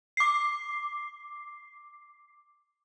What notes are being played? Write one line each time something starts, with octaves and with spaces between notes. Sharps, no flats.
D6 C7